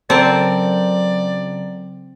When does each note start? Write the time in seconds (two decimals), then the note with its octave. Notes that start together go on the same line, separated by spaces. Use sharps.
0.10 C#3 F#3 C4 A4 A#4 D5